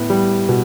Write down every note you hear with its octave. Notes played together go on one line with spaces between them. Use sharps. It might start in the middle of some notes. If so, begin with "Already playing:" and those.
Already playing: A2 B3
G3
B2